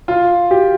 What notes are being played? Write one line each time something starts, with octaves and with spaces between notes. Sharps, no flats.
F4
G4